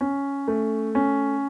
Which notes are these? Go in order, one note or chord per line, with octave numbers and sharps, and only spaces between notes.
C#4
A3
C#4